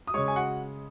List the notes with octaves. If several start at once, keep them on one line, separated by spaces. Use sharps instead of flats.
D#6
C#3 G#3 C#5 C#6
G#5
F#4 F#5